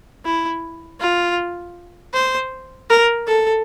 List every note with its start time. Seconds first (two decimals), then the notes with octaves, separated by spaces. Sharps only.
0.25 E4
1.00 F4
2.13 C5
2.90 A#4
3.27 A4